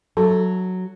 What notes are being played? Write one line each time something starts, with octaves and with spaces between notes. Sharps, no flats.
F#3 A4